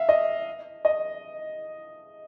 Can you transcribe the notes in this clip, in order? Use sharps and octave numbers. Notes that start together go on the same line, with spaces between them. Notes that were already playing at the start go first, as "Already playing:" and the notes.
Already playing: E5 F5
D#5
D#5